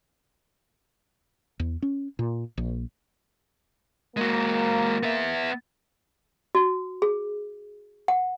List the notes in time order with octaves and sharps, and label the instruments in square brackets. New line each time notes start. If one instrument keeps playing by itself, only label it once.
[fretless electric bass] E2
C#4
A#2
A#1
[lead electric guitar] G#3 F#4 [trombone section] A#3
[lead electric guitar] B3 E5
[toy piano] F#4
G#4
F#5